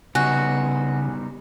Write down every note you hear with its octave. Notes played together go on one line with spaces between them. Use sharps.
C#3 G3 B3 D#4 F#4 G#5 F#6